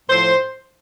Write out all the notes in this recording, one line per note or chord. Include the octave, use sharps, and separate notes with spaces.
A2 F3 C5